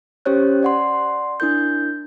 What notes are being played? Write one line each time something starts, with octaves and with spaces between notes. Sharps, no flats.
C#4 G4 C5 C#5 F#6
D5 F#5 C6
D4 E4 A#4 G6